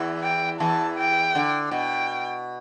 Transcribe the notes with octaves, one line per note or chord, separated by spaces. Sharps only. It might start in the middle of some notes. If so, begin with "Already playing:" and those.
Already playing: E2 E3
G5
E2 E3 A5
G5
D3
B2 G5